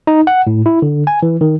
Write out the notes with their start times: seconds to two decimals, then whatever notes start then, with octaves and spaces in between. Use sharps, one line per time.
0.07 D#4
0.27 F#5
0.47 A2
0.66 E4
0.82 D3
1.07 G#5
1.23 E3
1.41 D#3